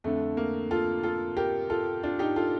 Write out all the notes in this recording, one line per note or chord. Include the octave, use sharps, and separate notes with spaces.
F2 D3 A3
A#3
F4 A4
F4 A4
G4 A#4
F4 A4
D4 F4
D#4 G4
F4 A4